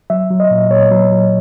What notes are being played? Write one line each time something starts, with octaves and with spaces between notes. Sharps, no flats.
F#3 E5
F#3
D#5
A#2
A#2 C#5
F#3
F#3